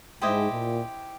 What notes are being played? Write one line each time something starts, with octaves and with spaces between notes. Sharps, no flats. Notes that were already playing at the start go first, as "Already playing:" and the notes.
G#2 E4 G4 C5 D#5
A#2